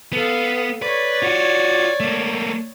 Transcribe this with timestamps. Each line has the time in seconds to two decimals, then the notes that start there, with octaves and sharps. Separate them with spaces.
0.13 B3 A4 F5
0.82 B4 C#5 D5
1.23 F4 F#4
2.00 A3 A#3